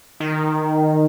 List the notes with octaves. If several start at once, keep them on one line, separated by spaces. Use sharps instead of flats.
D#3